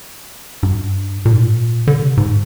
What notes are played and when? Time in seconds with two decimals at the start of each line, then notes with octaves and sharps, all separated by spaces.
0.63 G2
1.25 A#2
1.33 G#2
1.41 A#2
1.87 D3
2.03 C3
2.17 G#2